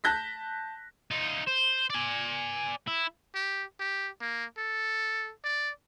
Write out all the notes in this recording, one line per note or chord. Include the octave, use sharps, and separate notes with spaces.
A5 F#6 G6 A#6 B6
D#4 F4
C5
D5 G#5
E4
G4
G4
A#3
A4
D5